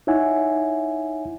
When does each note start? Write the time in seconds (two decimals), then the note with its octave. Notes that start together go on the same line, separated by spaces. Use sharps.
0.07 D#4 E4 C#5 E5 F#5 G#5